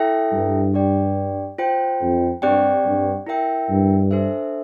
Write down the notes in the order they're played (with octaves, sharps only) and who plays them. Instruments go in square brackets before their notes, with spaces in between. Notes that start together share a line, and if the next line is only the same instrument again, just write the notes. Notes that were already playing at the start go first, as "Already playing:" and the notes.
Already playing: [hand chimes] E4 A4 E5 G5
[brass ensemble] G2
[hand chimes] G4 D5 G5
F4 C5 G5
[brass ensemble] F2
[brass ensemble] G2 [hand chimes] C4 G4 D5 G5
[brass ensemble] G2
[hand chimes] E4 A#4 E5 G5
[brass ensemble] G2
[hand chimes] D4 A4 C5 E5